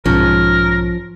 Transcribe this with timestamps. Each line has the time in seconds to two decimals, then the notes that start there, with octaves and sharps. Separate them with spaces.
0.05 B1 G#2 F3 C#4 A#4